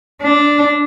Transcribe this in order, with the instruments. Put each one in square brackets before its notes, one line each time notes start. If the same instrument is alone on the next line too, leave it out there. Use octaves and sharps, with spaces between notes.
[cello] D4